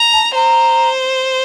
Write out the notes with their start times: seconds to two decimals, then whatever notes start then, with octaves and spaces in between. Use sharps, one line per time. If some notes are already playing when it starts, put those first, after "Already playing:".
Already playing: A#5
0.13 A5
0.35 C5 A#5